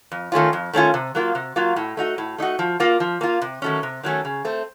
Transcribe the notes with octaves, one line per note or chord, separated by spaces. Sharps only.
F2
D#3 A3 C#4 F4
F2
D#3 A3 C#4 F4
C3
F#3 A#3 F4
C3
F#3 A#3 F4
A2
A3 D#4 F#4
A2
A3 D#4 F#4
F3
A#3 F4
F3
A#3 F4
C3
D#3 F#3 A3 C#4
C3
D#3 F#3 A3 C#4
C#3
A3 C4